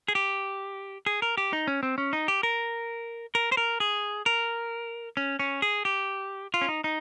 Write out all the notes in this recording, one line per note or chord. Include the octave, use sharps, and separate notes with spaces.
G#4
G4
G#4
A#4
G4
D#4
C#4
C4
C#4
D#4
G4
A#4
A#4
C5
A#4
G#4
A#4
C#4
C#4
G#4
G4
F4
C#4
D#4
D#4